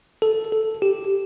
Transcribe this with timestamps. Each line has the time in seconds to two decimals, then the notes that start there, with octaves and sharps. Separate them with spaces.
0.22 A4
0.52 A4
0.82 G4